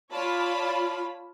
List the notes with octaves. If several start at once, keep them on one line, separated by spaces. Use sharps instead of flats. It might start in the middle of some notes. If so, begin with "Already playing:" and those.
F4 C#5 D5 A5 B5